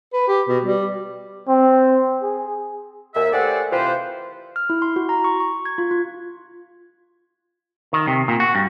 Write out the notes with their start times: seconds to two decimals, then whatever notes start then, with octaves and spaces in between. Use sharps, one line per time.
0.13 B4
0.28 G4
0.48 B2
0.64 G3
1.48 C4
2.22 G#4
3.14 D#2 E5
3.32 A3 G4 G#4 C5 D5 F#5
3.71 C3 E3 F4 G4 B4 C5
4.56 F6
4.70 E4
4.82 C6
4.96 F#4
5.09 A#5
5.24 C#6
5.40 C#6
5.65 G#6
5.78 F4
5.91 F4
7.93 D#3
8.07 C3
8.28 A#2
8.40 F#4
8.55 G2